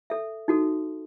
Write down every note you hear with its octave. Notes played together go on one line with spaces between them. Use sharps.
A4 E5
D#4 F#4 A4